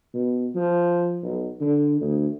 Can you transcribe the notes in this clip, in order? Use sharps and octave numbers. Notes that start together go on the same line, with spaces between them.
B2
F3
B1
D3
D2